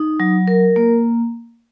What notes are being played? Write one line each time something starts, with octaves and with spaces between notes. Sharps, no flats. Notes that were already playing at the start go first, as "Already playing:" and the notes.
Already playing: D#4
F#3
A#4
A#3